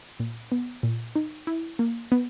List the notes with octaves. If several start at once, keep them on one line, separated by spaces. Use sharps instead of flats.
A#2
B3
A#2
D#4
E4
A#3
B3